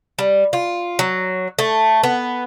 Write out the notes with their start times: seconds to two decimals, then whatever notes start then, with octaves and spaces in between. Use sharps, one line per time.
0.19 G3
0.53 F4
0.99 F#3
1.58 A3
2.03 B3